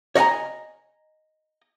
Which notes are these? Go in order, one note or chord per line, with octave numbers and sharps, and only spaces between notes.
C#5 D#5 F#5 G#5 A#5